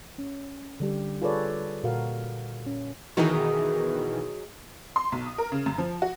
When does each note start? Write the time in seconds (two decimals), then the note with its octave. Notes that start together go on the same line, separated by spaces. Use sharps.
0.18 C#4
0.80 D3 G3 G4
1.22 F4 G#4 A4 B4 C#5 D5
1.84 A#2 F#4 A4 A#4 F5
2.66 C#4
3.17 B2 D#3 E3 F#3 D#4 G#4
4.96 C6
5.12 B1
5.26 D#6
5.38 A#4
5.52 C#3
5.66 F#2
5.78 F3
6.02 F#4